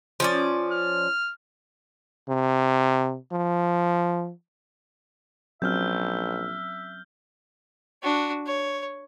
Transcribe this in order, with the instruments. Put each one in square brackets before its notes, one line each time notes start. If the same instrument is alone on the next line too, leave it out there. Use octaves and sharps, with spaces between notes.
[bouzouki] F3 C#4 D5
[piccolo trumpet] F6
[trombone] C3
F3
[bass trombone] A#1 [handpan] F#3 C4 C#4 [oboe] E5 [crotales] F6 G6
[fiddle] D4 F#4
C#5